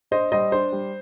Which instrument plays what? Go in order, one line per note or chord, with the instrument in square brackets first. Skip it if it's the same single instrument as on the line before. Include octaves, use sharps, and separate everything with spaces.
[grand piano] D4 C5 D#5
G3 C5 D#5
D4 C5
G3